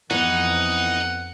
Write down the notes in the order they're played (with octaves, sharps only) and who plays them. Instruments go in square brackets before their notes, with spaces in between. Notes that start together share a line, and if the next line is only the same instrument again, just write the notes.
[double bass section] F2 [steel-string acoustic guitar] E3 B3 [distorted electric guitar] D#4 [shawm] F#5